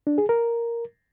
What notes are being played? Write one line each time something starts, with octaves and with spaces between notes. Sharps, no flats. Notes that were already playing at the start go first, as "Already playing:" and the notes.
D4
G#4
A#4